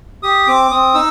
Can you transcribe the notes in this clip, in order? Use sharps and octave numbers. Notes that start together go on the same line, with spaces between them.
G4 D#6
C4 D6
C4 D#6
D#4 E6